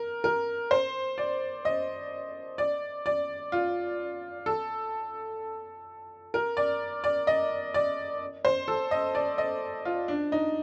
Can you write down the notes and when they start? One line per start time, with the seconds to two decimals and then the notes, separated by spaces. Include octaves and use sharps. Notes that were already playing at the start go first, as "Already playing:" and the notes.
Already playing: A#4
0.24 A#4
0.71 C5
1.18 D5
1.65 D#5
2.58 D5
3.06 D5
3.52 F4
4.46 A4
6.34 A#4
6.57 D5
7.04 D5
7.27 D#5
7.74 D5
8.45 C5
8.68 A4
8.91 D#5
9.15 D5
9.38 D#5
9.85 F4
10.08 D4
10.32 D#4